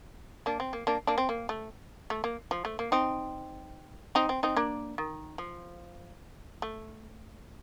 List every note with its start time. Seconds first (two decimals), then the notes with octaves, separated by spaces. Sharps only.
0.46 A#3 D4
0.60 C4
0.73 A#3
0.87 A#3 D4
1.07 A#3 D4
1.18 C4
1.29 A#3
1.49 A3
2.10 A3
2.24 A#3
2.51 F3
2.65 A3
2.79 A#3
2.92 C4 D#4
4.15 C4 D#4
4.29 C4
4.43 C4 D#4
4.56 A#3 D4
4.98 D#3
5.38 F3
6.62 A3